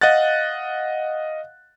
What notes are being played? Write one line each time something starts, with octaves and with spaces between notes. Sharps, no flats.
D#5 F5 F#5 F#6 A6